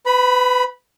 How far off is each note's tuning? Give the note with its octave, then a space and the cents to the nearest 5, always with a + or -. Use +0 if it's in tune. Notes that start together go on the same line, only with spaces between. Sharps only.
B4 +25 B5 -10